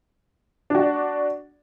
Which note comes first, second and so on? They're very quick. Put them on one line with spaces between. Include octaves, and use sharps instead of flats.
D4 F#4 D5